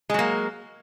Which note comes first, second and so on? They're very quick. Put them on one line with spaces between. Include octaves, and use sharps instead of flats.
G#3 F#3 A#3